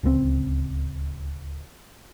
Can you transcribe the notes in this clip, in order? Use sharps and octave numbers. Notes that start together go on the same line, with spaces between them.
D1 C#2 D#3 C4